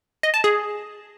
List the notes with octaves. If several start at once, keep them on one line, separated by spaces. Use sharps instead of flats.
D#5
A5
G#4